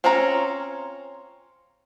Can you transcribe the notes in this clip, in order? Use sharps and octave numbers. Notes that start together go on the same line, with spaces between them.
C4 C#4 F4 C#5 A#5